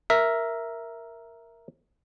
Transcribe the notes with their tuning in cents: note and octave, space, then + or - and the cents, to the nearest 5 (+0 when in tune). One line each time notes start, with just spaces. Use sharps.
A#4 +0 E5 +0